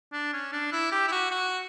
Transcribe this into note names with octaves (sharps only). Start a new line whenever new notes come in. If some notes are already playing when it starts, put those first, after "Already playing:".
D4
C#4
D4
E4
G4
E4
F#4
F#4